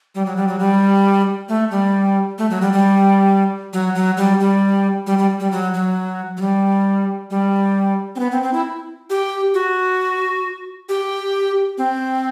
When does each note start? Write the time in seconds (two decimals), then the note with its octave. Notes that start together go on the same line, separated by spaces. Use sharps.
0.15 G3
0.26 F#3
0.37 G3
0.48 F#3
0.59 G3
1.49 A3
1.71 G3
2.38 A3
2.50 F#3
2.62 G3
2.73 G3
3.73 F#3
3.95 F#3
4.17 G3
4.40 G3
5.07 G3
5.18 G3
5.40 G3
5.52 F#3
5.74 F#3
6.37 F#3
6.41 G3
7.30 G3
8.16 C4
8.20 B3
8.32 C4
8.42 C4
8.53 E4
9.10 G4
9.54 F#4
10.89 G4
11.78 C4